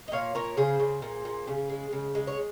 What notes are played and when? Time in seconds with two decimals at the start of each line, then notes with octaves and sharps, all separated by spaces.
0.08 D#5
0.12 A#2 C#5 F5
0.35 A#2 A#4 C#5
0.57 C#3 G#4 C5
0.79 C#3
1.02 A#2
1.25 A#2
1.47 C#3
1.69 G#3
1.92 C#3
2.15 G#3
2.27 C#5